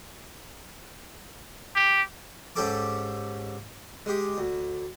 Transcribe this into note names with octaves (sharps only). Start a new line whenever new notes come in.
G4
G#2 C#4 G4 A4 A5 D6
G#3 G4
D2